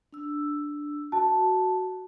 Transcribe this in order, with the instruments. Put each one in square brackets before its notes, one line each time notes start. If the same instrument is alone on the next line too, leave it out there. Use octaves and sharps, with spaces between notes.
[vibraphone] D4 E6
[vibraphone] F#4 [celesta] A5